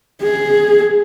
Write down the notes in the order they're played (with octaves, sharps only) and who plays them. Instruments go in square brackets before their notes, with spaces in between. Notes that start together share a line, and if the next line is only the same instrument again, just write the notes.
[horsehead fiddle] G#4